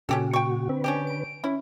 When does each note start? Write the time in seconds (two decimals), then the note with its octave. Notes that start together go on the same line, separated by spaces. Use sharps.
0.09 A#2 C#3 C#4 F#4 G4 A4
0.33 G5 C#6
0.69 D3 C4 B4
0.84 C#4 D4 G4
1.07 D7
1.44 C#4 E4